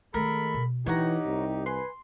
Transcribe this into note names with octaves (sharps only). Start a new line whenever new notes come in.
D#3 G#3 A3 A4 A#4 B5
B2
E3 D4 D#4 G4 C#5 F#5 A#5
C2
B4 G#5 C6